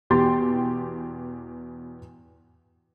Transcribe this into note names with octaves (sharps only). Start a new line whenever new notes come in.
E2 B2 G4 G5 C6 A6